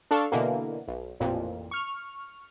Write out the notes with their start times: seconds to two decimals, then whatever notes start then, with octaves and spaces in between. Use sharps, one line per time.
0.11 D4 A4 F5 C#6
0.32 B2 D3 E3 A#3
0.88 B1
1.20 A1 F2 A#2
1.71 C#6 F6